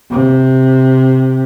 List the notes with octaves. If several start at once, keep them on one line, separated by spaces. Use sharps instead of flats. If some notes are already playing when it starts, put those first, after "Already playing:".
C3